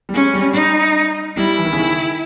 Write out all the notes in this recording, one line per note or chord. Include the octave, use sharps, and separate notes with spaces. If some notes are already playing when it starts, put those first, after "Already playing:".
G3
G#3 C#4
G3
D#4
G3 E4
E3
D#3
C#3
D#3